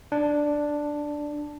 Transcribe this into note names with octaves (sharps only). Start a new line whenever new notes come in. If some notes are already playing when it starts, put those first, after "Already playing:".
D4